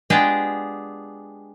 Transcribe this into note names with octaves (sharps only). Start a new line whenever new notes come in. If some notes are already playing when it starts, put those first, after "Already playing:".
G#3 B3 D4 F4 G4 G#4